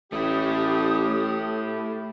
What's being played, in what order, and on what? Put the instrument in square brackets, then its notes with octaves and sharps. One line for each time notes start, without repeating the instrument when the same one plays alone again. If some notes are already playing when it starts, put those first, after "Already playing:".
[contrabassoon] A1 [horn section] A2 G4 [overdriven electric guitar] A3 E4 [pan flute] D#6